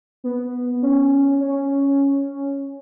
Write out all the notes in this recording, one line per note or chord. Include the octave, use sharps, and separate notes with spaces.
B3
C#4
C#4